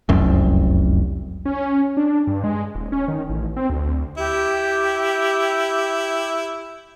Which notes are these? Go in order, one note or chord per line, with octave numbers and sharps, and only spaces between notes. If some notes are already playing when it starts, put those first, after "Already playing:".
F1 C2 F#2
C#4
D4
G2
G#3
D#1
C#4
D#3
A1
C4
D2
E4 G4